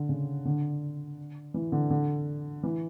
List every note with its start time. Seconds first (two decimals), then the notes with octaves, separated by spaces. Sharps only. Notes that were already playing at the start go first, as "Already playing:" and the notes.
Already playing: D3
0.09 C#3
0.45 D3
1.54 E3
1.72 D3
1.90 D3
2.63 E3